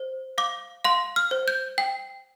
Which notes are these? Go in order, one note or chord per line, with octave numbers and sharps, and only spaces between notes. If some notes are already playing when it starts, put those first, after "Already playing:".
Already playing: C5
F5 D6
F5 C6
F6
C5
G6
G5